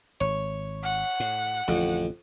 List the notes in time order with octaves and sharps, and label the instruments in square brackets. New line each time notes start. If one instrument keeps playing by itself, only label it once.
[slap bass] G#1 [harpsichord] C#5
[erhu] F#5
[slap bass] A2
[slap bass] A1 D3 [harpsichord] F2